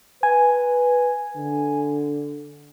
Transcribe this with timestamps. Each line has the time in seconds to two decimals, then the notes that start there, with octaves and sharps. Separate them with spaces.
0.23 B4 G#5
1.36 D3